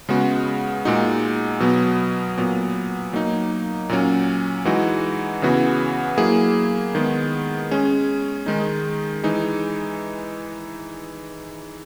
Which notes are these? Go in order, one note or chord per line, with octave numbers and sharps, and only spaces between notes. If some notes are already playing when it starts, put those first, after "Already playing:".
C#3 G#3 B3 F#4
A#2 G#3 D#4 F#4
B2 F#3 B3
A#2 F#3 B3
F#3 A#3 D#4
A#2 F#3 C#4
E3 G#3 D#4 F#4
C#3 E3 B3 F#4
F#3 A#3 E4 G#4
D#3 G#3 B3
G#3 C#4 G#4
D#3 G#3 D#4
E3 G#3 D#4